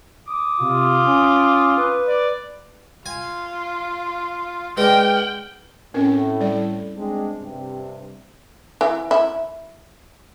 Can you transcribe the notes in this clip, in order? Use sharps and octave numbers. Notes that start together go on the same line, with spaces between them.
D6 D#6
C3 F4
C#4
B4
D5
F4 G#5
G#3 D4 B4 G5 F6
A2 C4 C#4 A#4
G3 D5
G#3 C4 D4
G2 C3
E3
E4